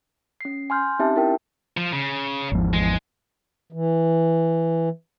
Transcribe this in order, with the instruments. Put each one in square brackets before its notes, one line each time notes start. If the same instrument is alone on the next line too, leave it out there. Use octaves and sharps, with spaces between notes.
[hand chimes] C#4 C7
G#5 C6 F6 G6
C4 C#4 D#4 G4 E5 A5
E4 A#4 G5
[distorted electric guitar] F3
C#3
[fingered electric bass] G#1 E2 F3
[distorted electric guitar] G#3
[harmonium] E3